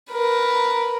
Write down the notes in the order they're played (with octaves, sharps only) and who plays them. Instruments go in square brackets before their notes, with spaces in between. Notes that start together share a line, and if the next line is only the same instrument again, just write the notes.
[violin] A#4 B4